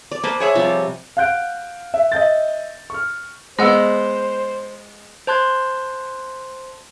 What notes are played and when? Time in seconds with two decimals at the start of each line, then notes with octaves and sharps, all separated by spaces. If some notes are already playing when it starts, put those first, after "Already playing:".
0.11 D5
0.24 A#3 B4 C5 A5
0.40 G#4 C#5 E5
0.55 C3 F3 G3
1.17 F5 F#5 F#6 G6 D7
1.94 E5
2.12 D#5 E5 G6 A6
2.90 C#6 F6
3.59 G#3 B3 C5 D#5 F#5 E6
5.27 C5 A5 C6 F#6 G#6